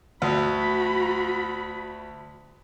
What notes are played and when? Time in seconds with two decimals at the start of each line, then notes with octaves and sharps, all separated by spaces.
0.22 D2 F#4 B5